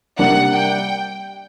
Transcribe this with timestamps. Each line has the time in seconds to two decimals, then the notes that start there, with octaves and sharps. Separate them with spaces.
0.19 C3 G3 A#3 D4 F#5
0.54 G5